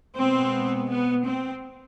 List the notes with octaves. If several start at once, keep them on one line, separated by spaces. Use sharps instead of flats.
B2 G#3 B3 C4
B3
C4